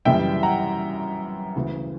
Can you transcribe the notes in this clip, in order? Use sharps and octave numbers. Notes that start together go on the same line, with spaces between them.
F#2 C#3 E3 G3 E5 G5
F#5 A#5
D2 C#3 E3